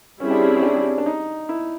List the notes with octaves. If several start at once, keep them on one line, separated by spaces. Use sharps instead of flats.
G3 C4 C#4 E4 G#4
D4
C#4
C#4
D4
D4
D#4
E4